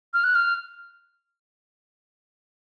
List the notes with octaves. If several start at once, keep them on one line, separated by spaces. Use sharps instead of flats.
F6
F#6
F6